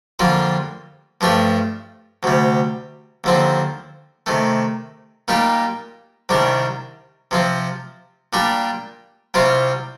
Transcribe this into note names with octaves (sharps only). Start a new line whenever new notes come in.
F2 D3 G3 A#3 F4
G2 F3 A3 D4 G4
D2 C3 G3
D#2 D3 F3 C4
C3 D#3 A3
A#2 G3 A#3 D#4 G4
C2 C3 D#3 G3 D4
C3 F3 C4
A#2 G3 D4 G4
C2 C3 G3 C4 F4